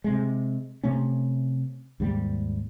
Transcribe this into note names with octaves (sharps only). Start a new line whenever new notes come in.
C3 G#3
C3 A3 C#4
D#2 G#2 G3 A#3